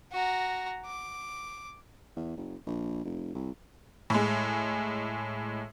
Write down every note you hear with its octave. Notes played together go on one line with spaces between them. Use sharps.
F#4 A#5
D6
E2
F#1
A#1
F1
C2
A2 G#3